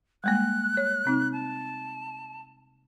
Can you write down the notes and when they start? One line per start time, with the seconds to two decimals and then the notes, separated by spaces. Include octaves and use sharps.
0.24 G3 G#3 A#3 F#6
0.77 C#5
1.05 C3 C4 D#4
1.32 A5